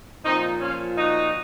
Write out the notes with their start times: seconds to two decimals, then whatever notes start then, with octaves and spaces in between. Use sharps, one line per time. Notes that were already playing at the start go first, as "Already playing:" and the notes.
0.25 A#2 F3 C4 D#4
0.61 C#4 F4
0.97 D#4 F#4